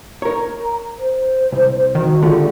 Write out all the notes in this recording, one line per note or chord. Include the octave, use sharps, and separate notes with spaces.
A#4 C#5 A#5
C5
C2
D#3 F#4
D3 A3 F4 G4 G#4